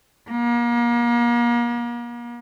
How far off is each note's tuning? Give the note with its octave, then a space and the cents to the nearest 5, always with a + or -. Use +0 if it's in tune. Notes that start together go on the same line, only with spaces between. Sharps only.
A#3 +35